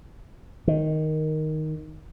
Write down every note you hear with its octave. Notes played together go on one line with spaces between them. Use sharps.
D#3